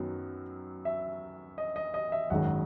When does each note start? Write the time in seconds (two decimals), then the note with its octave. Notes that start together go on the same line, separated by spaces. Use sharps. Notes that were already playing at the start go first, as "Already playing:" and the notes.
Already playing: F#2 D#3 F#3 B3
0.85 E5
1.58 D#5
1.76 D#5
1.94 D#5
2.12 E5
2.30 G#1 F#2 D#3 G#3 F#5